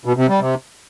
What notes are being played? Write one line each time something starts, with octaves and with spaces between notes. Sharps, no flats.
B2
C3
G3
C3